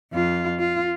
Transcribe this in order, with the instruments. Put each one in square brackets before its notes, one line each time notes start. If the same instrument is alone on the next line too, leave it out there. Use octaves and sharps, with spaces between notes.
[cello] F2 F4
F4